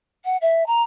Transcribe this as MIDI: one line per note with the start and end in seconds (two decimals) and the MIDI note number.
0.24 0.36 78
0.41 0.66 76
0.66 0.82 82